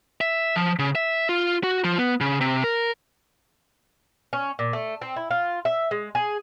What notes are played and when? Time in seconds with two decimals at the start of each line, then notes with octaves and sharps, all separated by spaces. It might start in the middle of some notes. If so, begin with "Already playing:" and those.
0.21 E5
0.56 F3
0.79 C#3
0.95 E5
1.29 F4
1.63 F#4
1.84 F3
1.98 B3
2.21 C#3
2.41 C3
2.64 A#4
4.33 C#4
4.59 A#2
4.73 A3
5.02 C4
5.16 E4
5.31 F4
5.65 E5
5.91 G#3
6.15 G#4